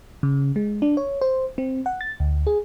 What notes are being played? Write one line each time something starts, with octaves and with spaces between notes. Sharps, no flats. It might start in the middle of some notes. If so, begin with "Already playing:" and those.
C#3
G#3
D4
C#5
C5
C4
F#5
A6
D2
G#4